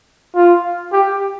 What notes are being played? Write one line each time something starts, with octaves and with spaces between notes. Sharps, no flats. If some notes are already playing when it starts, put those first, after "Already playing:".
F4
G4